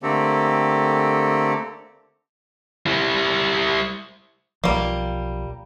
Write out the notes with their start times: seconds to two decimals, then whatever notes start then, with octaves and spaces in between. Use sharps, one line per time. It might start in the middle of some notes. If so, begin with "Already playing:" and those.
0.03 D3 A3 A#3 C4 G4 A4
2.86 G3 E4
4.64 B1 F3 G3 A#3